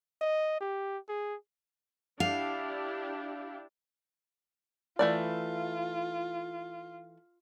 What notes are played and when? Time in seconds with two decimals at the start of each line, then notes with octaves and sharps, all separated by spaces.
0.21 D#5
0.61 G4
1.09 G#4
2.20 D4 E4 G4 F5
4.99 E3 A3 F4 D5